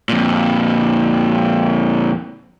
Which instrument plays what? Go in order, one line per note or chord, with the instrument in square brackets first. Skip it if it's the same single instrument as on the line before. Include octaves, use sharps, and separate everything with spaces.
[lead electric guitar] F2 A#2